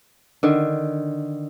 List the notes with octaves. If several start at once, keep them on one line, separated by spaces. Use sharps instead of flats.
D3 D#3